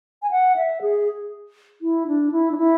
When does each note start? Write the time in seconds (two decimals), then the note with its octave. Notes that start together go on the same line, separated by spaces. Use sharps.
0.23 G#5
0.31 F#5
0.56 E5
0.82 G#4
1.82 E4
2.07 D4
2.32 E4
2.52 D4
2.57 E4